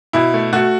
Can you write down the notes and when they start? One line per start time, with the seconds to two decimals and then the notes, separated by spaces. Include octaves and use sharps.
0.13 B2 E4
0.34 A3
0.53 A3 F#4